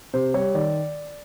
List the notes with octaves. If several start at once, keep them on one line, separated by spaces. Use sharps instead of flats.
C3 C5
G3 C#5
D#3 D5